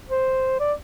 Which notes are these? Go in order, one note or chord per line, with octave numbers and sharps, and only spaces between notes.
C5
D5